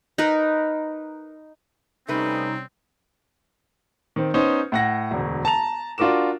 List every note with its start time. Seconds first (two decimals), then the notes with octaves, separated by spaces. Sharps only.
0.18 D#4 A#4 B4
2.08 C3 G3 A3 C4 C#4 D#4 B4
4.16 D#3 C4
4.34 B3 C#4 D#4 C5
4.72 A2 F#5 A#6
5.11 E1 D2
5.45 A5 A#5 F7
5.98 D4 F4 F#4 A#4 D6 E7